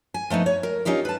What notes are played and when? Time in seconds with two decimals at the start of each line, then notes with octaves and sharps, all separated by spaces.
0.14 G#5
0.30 F3 A3 B3 D#4
0.46 C#5
0.63 A#4
0.85 C#4 D#4 F4 G4 A#4
1.05 B4 A5